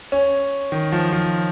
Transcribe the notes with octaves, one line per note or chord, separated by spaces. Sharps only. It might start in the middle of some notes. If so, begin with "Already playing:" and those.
C#4
D#3
F3
F3